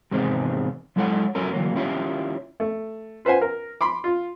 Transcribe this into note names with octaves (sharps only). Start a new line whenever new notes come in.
E2 G#2 C3 D#3 G#3 C5
F#3 G#3 E4 A4 C#5 F#5
F#2 F#3 A3 C#4 A#4
D3 E3 F#3 A#3
D#3 C#4 E4 F4 G4 C#5
A3
F4 B4 C5 F#5 G#5
A#4
B5 C6 D6
F4